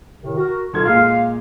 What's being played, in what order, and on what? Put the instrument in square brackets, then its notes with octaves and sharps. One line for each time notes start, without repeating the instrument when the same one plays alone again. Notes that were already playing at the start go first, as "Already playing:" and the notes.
[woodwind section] A2 C3 D#3
F#4 A#4
[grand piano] B1 A4 G#6 [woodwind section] F4
[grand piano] A#2 G#3 [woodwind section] F5